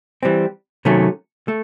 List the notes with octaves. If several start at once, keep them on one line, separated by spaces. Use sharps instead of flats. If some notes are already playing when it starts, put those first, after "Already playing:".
E3 G3 C4
C3 D#3 F#3 A3 C#4
A3